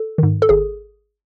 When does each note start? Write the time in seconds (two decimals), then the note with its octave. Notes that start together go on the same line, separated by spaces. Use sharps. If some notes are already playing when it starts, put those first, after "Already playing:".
Already playing: A4
0.18 G#2 D#3
0.42 A4
0.49 G#1 G#4